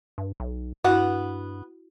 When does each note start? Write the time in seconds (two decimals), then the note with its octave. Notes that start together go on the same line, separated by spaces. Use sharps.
0.18 G2
0.40 B1
0.84 G2 B3 E4 F#4 F#5